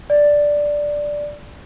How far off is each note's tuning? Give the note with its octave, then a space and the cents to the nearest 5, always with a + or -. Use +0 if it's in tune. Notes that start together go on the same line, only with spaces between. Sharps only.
D5 +0